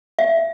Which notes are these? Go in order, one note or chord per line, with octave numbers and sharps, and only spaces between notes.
E5